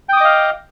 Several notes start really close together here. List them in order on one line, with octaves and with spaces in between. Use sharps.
G5 D#6 D6 D#5 F5